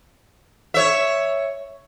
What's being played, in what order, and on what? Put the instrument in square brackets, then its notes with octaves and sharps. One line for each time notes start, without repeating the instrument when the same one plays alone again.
[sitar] C#5 E5